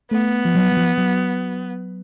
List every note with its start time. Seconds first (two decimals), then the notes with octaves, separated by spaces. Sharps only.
0.11 A3 B3
0.45 F3
0.55 F#3
0.72 F#3
0.77 F3
0.98 F#3